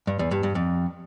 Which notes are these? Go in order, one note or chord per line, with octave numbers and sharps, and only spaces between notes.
G2
E2
G2
G2
F2